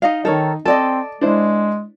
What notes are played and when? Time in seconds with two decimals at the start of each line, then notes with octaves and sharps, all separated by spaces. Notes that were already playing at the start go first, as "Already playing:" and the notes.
0.02 D#4 D#5 F5
0.25 D#3 D#4 A4 A#4 C#5
0.66 C4 A4 D5 D#5 A5
1.21 G#3 D4 E4 C5